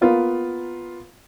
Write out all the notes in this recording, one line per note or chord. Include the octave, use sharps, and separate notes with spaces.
A#3 B3 F4